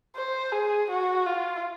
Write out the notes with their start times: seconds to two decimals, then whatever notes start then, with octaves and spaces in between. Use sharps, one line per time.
0.16 C5
0.52 G#4
0.90 F#4
1.26 F4